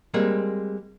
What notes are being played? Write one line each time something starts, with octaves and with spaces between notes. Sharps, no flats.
G3 G#3 A#3 C4